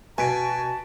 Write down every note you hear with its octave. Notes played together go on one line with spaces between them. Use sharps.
B2 F#4 G#5 A5 B6 D7